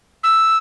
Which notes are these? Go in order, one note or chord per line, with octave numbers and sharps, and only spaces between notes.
E6